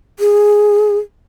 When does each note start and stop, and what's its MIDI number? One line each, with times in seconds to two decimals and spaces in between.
0.19 0.98 68